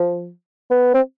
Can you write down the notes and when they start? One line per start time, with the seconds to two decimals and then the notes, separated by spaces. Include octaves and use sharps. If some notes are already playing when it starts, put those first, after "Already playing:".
Already playing: F3
0.71 B3
0.94 C4